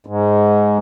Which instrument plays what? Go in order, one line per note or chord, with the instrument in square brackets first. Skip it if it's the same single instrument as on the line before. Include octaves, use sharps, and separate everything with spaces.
[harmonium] G#2